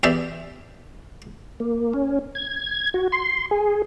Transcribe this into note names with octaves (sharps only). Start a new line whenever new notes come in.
E2 G4 G#4 D5 E5 G5
A#3
C#4
G#6
F#4
C6
G#4